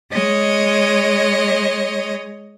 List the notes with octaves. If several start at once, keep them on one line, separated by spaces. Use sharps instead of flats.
G#3 C#5 D#5